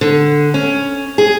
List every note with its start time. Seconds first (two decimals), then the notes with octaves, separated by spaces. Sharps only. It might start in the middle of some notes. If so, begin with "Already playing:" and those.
0.01 D3
0.54 C#4
1.18 G#4